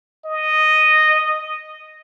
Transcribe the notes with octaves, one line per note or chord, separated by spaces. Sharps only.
D#5